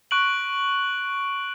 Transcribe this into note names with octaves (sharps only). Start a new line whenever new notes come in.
C#6 F#6 D7 F#7